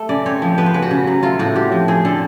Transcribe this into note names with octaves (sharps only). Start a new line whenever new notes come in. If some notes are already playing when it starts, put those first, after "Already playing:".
Already playing: A3
C#3 D5
C4 C#5
F3
B3 B4
C5
C#3 B4
F#4
C#3
F#3
A3 F4
A2 F#4
C4 G4
F3
C4 G#4
D3 A4